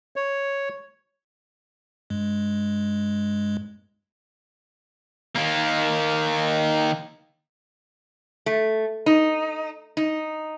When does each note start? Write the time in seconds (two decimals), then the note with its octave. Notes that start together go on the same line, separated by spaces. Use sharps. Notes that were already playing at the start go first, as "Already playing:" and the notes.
0.16 C#5
2.10 G2 G#3
5.35 D#3 A#3
8.46 A3
9.06 D#4
9.97 D#4